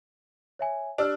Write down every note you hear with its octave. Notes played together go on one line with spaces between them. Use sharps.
C#5 E5 G#5
D4 G4 E6 F6